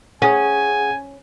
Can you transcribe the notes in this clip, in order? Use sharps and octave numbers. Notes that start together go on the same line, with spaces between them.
C#4 G#4 F#5 G#5